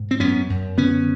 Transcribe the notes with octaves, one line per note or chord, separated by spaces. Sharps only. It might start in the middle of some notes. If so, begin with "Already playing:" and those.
Already playing: G#2
C4
F#2 B3 C#4
F#2
D3 B3 C#4